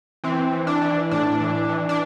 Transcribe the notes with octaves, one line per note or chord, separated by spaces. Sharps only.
E3 C4
E3
D4
E3
A2 D4
E3
E3
D4